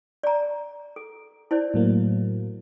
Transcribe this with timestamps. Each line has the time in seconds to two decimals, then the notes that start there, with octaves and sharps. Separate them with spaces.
0.23 D5 A#5
0.96 A4
1.51 E4 C5 D5
1.74 A2 F#3 A#3